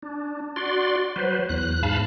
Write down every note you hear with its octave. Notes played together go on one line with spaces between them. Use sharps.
D4
F#4 D5 C6
F#3 B4 C5
E2 F#6
G#2 F5 A5 B5